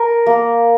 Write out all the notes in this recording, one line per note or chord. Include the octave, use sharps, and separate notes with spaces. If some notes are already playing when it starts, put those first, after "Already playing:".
Already playing: A#4
A#3